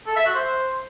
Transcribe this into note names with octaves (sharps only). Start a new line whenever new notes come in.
A4
E5
F#4
C5